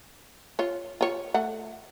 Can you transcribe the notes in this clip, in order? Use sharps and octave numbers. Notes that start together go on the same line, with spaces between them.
F4 C#5
F4 C#5
A3 F#5